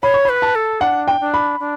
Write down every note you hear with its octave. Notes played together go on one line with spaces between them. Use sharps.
C#5 B5
C#6
B4 B5
A5
A4
D4 F#5
G5
D4
B5
D4